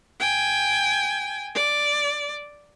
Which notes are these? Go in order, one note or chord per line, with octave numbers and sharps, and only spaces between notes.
G5 G#5
D5